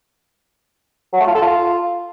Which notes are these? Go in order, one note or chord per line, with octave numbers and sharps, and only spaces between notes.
F#3
A3
F4
A4
F4